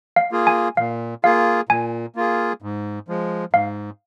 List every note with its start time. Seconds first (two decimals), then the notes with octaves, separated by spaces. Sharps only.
0.16 F5
0.32 A#3 F4 G#4
0.47 G#5
0.77 A#2 F5
1.24 A#3 F4 G#4 F5
1.69 A#2 G#5
2.16 A#3 F4 G#4
2.62 G#2
3.08 F3 G#3
3.53 G#2 F5